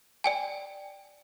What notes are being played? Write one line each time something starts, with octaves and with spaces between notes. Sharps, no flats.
D5 G5 G#5